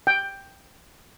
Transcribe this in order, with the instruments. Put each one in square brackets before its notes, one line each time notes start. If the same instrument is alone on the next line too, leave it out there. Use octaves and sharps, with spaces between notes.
[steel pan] G5